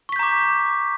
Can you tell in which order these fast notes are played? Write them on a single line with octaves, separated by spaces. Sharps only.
C#6 B6 G6 A#5 D6